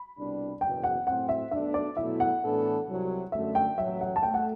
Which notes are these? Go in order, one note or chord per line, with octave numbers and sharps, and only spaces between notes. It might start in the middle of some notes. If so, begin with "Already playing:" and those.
Already playing: B5
C2 B2 G3 D4
F#1 E2 B2 G5
F#5
A2 F#3 C4 F#5
E5
B1 B2 A3 D4 E5
D5
B2 F#3 A3 E4 E5
F#5
A2 E3 B3 D4 A4
C2 C3 F#3
F#2 D3 A3 E5
G5
A1 A2 F#3 E5
F#5
A5
A3 G5
F#5